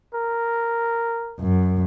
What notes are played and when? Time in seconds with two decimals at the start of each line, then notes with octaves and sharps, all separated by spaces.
0.14 A#4
1.40 F#2